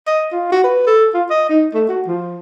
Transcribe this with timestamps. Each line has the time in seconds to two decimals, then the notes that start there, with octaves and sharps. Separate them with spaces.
0.07 D#5
0.32 F4
0.52 F#4
0.64 B4
0.87 A4
1.14 F4
1.30 D#5
1.49 D#4
1.74 A3
1.89 F#4
2.07 F3